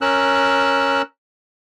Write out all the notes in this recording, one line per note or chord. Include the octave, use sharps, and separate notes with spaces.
C#4 A#4 E6 F#6